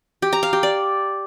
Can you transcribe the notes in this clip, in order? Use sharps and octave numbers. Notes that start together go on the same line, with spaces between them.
G4
A#5
F5
G4
D5